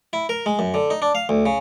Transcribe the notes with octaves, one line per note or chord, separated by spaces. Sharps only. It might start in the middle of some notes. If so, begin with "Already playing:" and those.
E4
A#4
G#3
F#2
D3
D#4
D4
F5
D2
C#3